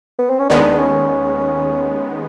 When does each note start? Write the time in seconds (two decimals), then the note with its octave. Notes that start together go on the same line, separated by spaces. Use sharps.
0.19 B3
0.30 C4
0.39 C#4
0.49 D#2 D#3 G#3 B3 D4
0.79 C#4